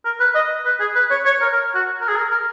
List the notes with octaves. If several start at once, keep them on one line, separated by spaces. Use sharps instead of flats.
A#4
B4
D#5
B4
G#4
B4
C#5
C#5
A#4
A#4
F#4
A#4
G#4
A#4
A#4